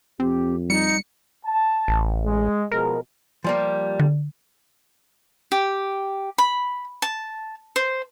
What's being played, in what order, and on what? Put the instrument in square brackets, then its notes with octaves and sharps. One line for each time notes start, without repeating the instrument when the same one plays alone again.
[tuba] F2 [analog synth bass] C4 [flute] G4
[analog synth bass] G3 [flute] D#4 [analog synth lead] C#7
[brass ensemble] A5
[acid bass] A1
[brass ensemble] G#3
[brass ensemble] B2 F3 G#3 [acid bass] A#4
[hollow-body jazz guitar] F3 G3 A#3
[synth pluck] D3
[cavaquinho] G4
B5
A5
C5